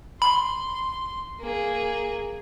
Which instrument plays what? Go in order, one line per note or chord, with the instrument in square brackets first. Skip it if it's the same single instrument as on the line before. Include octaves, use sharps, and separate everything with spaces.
[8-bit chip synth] B5 [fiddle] C6
[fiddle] A#3 G#4